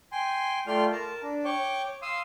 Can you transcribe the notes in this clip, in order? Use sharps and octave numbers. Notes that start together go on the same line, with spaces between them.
G5 G#5 C6
A3 F4 D5 G5 C6 F6
A#4 A5
D4
C#5 G5 C#6 D6
F5 C6 D#6 E6